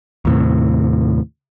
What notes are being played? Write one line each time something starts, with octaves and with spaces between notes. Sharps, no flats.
D#2 A2 C3